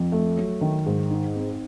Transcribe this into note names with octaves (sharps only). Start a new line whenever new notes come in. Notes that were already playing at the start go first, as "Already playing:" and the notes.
Already playing: F2
A3
F#3
D#3
G#2
D#4
C4